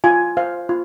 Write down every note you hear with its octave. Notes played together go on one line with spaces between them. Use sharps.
F4 G#5
C5 F5
F4